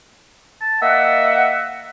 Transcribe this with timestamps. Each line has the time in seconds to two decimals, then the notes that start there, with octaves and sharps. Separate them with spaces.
0.61 A5
0.82 A#3 D#5 E5 F#5